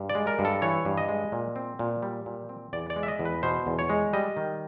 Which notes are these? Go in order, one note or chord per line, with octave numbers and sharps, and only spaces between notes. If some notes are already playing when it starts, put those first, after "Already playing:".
Already playing: G2
D5
G#3
A#4
G2
A4
E3 C#5
G2
D#5
G#3
A#2
C4
A#2
G3
A#2
C4
E2 D5
D5
G#3
E5
D#5
E2
B4
B2 C5
E2
C#5
G#3
G3 D#5
D#3